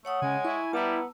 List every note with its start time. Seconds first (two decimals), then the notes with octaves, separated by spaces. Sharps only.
0.05 A3 C#5 F#5 D#6
0.22 C#3 G#3 G#5
0.45 E4 C#6
0.73 G3 B3 E4 A5 A#5 E6